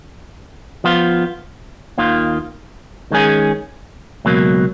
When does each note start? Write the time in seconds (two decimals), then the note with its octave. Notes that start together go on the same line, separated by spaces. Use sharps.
0.84 F3 B3 F4
1.98 D#2 D#3 A#3 F4
3.11 D#3 G#3 C#4 G#4
4.25 C#2 B2 F#3 A#3